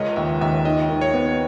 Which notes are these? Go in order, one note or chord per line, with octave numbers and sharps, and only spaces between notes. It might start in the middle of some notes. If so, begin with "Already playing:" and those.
Already playing: C#2 G#3 A#4 B4 C#5 D#5
D#2 E5
D#2 E5
D#3 D#5
D#3
C#5
B3